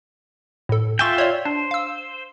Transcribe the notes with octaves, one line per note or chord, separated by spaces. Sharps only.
A2 A4
F4 E5 G5 G#5 C6 C#6
C#5 D5
D4 C5
F5 E6